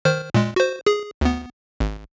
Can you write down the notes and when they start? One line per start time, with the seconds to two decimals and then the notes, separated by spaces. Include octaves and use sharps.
0.05 D#3 C5 F6
0.34 A#2 G#3
0.56 F#4 C5
0.87 G#4
1.21 D2 B3
1.80 G#1